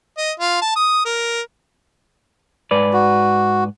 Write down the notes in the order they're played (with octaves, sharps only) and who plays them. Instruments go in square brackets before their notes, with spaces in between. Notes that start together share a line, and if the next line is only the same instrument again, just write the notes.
[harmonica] D#5
F4
A5
D#6
A#4
[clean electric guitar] G#2 B4 D5
[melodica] F#4